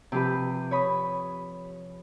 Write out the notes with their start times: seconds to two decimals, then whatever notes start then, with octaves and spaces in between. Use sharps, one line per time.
0.12 C3 F3 G4 B4
0.71 C#5 B5 D#6